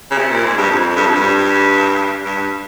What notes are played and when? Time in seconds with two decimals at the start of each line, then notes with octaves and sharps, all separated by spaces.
0.11 C#3
0.18 C3
0.31 A#2
0.45 G#2
0.58 G2
0.70 F2
0.96 G2
1.06 F2
1.15 G2
2.26 G2